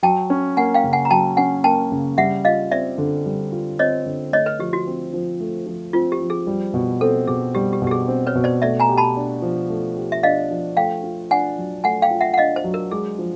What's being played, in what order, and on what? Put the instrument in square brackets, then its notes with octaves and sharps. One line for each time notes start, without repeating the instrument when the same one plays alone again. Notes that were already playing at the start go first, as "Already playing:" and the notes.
[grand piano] F#3 [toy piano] G5 A5
[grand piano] C#4
[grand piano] A#3 [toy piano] F#5 G#5
[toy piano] F5 G5
[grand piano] C#3
[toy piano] F#5 G#5
A#5
[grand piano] F#3 [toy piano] G5 A5
[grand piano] C#4 [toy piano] F#5 G#5
[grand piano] A#3 [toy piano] G5 A5
[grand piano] C#3
[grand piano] G3 [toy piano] E5 F#5
[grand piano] F4 [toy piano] D#5 F5
[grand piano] C4 [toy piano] D5 E5
[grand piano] D3
G3
F4
[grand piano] C4 [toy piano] C#5 D#5
[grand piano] D3
[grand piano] A3 [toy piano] C#5 D#5
[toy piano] B4
[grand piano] F3 [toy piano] G4
[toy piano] F#4
[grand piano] C4
F3
A3
F3
[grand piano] C4 [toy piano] F4
[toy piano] G4
[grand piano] F3
[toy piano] G#4
[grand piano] G3
B2
[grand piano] C4 [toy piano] A4
[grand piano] B2 [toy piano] G#4
[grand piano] G3 [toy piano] G4
[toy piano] G4
[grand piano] B2
[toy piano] G4
G#4
[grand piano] C4
[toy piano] B4 C#5
[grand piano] B2
[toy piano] C5 D5
[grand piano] A3 [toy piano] D5 E5
[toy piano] G#5 A#5
[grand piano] G4
[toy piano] A5 B5
[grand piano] D4
F3
A3
G4
[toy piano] E5
[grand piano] D4 [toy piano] D#5 F5
[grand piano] F3
[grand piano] A3 [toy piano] F5 G5
[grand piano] F4
[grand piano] D4 [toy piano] F#5 G#5
[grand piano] F#3
[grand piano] A3 [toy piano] F#5 G#5
[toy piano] F5 G5
[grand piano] F4
[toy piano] E5 F#5
F#5
[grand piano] D4 [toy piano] D#5 F5
[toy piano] C5
[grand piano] F#3
[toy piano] A#4
[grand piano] G#3 [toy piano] G#4
[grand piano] F3